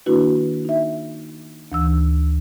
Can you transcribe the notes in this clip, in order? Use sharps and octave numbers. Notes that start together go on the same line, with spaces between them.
D#3 A#3 D4 E4 F#4 B4
D#4 E5
D2 E3 E6